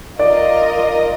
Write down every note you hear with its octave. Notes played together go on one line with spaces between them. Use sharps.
F4 A#4 D5 D#5